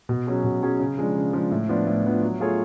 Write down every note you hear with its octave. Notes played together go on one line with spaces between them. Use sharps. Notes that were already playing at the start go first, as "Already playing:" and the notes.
B2
F#3 C#4 G#4
B2
F#3 C#4 G#4
C#3
F3 G#3 D4
C#3
F3 G#3 D4
A2
F3 B3 D4 F4
A2
F3 B3 D4 F4
F#3
A3 F4 G#4 C#5